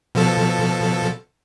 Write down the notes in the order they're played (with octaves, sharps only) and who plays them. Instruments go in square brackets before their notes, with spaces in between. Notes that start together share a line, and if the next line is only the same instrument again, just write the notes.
[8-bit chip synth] B2 F3 A4